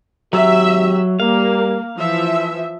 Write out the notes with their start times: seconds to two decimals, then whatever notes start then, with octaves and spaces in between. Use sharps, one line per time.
0.33 G#1 F#3 G4 E5
1.20 G3 A#3 A#4 F5
1.98 E3 F3 E5